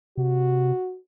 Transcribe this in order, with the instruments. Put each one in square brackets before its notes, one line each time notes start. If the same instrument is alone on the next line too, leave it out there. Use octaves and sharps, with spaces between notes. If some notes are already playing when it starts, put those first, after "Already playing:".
[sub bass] C3 [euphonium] F#4